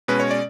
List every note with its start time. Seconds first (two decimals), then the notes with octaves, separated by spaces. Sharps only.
0.08 B2 G#3 C#4 B4
0.20 C#5
0.31 D5